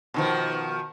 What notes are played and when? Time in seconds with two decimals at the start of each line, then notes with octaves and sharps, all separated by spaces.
0.14 B2 D#3 F3